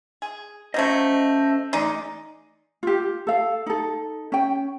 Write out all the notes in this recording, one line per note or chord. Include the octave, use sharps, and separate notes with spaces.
G#4
F3 F#3 A3 C#4 C5 D#5
A2 E3 D#4 G#4 D5 C6
F4 G4
A4 F5
D#4 A4
C#4 G5